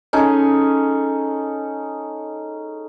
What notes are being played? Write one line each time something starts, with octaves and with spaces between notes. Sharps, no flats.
C#4 D#4 G#4 A4